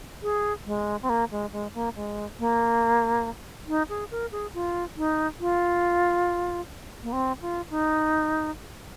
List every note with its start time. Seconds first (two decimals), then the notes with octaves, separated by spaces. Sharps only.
0.23 G#4
0.66 G#3
1.02 C4
1.09 A#3
1.31 G#3
1.52 G#3
1.74 A#3
1.95 G#3
2.39 A#3
3.68 D#4
3.89 G#4
4.11 A#4
4.32 G#4
4.54 F4
4.97 D#4
5.41 F4
7.03 A#3
7.13 C4
7.41 F4
7.70 D#4